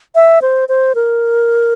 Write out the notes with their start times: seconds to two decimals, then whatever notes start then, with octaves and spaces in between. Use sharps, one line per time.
0.15 E5
0.42 C5
0.69 C5
0.95 A#4